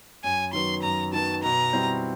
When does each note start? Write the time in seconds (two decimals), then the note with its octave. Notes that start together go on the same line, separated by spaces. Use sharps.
0.24 F#2 G#5
0.53 D#3 F#3 B3 C6
0.83 F#2 A#5
1.13 D#3 F#3 B3 A5
1.43 B2 A#5
1.73 G3 C4 E4